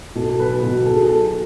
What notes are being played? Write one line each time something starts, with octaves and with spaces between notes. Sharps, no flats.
B2 A4
A4
B1 B4
B2
B1 A4
G#4
B1 A4